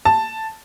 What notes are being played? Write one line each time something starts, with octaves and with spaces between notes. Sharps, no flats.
A5